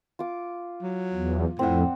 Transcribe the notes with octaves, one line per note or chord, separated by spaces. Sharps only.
F4 D6
F#3
E2
F2 A2 C4 D5 F#5